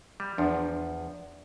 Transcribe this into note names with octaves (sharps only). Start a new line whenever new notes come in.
G3
E2 F3 D4